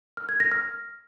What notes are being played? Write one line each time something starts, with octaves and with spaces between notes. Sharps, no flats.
F6
G#6
A#6
F6